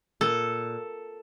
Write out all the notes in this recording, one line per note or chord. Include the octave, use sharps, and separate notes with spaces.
A#2 A4